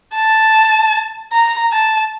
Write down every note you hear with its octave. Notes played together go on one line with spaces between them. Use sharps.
A5
A#5
A5